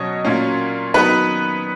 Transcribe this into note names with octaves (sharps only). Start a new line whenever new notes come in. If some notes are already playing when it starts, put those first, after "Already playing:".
Already playing: B2 F#3 C#4 C#5 D#5
A#2 F#3 A#3 C#4
D#3 F#3 B3 D#4 B4